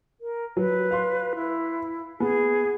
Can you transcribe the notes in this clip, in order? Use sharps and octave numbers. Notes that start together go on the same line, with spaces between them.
A#4
F#3 B4
F5 C6
E4
B3 G#4